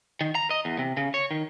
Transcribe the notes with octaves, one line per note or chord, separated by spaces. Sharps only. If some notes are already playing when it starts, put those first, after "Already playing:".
D#3
A#5
D#5
E2
C3
C#3
C#5
D#3